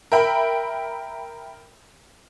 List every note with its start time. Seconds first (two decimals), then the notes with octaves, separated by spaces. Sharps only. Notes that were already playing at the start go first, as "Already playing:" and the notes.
0.12 A#4 E5 G5 B5